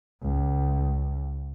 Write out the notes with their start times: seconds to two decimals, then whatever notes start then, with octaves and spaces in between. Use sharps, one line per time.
0.23 C#2